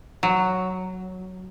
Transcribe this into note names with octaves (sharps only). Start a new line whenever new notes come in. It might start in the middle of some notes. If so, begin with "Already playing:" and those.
F#3